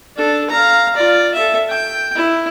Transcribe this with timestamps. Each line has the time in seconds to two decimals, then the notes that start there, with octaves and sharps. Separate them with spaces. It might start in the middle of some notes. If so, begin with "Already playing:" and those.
0.16 D4 A4
0.50 F5 A#5
0.96 F4 D5
1.34 A4 E5
1.69 G5
2.16 E4